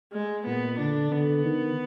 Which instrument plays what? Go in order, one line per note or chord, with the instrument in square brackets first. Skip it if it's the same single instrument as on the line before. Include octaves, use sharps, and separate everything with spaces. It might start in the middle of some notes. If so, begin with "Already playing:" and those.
[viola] G#3
[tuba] A#2 [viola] B3
[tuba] D3 [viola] D4
[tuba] D3 [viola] B3
[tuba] D#3